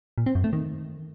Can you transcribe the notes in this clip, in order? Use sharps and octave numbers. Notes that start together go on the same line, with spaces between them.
A#2
C4
F#2
A3
D#3